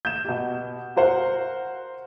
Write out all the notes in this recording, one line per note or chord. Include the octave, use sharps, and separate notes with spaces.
G6 E7
B2 G4
F#4 A#4 C5 F5 F#5